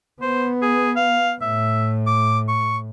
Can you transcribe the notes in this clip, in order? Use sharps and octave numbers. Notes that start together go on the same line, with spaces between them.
B3 C5
G#4
F5
A2 E5
D6
C#6